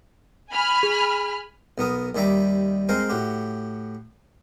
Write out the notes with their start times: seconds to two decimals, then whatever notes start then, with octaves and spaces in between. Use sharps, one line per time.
0.52 G#5 B5 F6
0.83 G#4
1.78 B1 B3 A#4 D#6
2.15 D#2 D#3 G3 E5 A#5 D6
2.89 G#3 C4 A#4 C5 F5
3.10 A2 F#4 G4